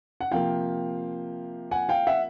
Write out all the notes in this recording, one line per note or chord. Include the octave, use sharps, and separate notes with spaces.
F#5
C3 F3 A#3 F5 G5
F#5 G#5
F5 G5
E5 F#5